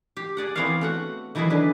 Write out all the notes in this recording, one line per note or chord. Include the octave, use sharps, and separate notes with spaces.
G4
G#4 D5 F#5
E3 B3 C4 C#5 D5 F5
A3 F#4 F#5
D#3 E3 F#3 B3 E4 G#4
D3 D4 B4